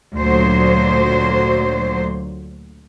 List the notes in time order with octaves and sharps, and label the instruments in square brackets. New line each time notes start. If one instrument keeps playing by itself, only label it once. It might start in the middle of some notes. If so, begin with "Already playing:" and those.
[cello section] D2 A#2 F#3 C5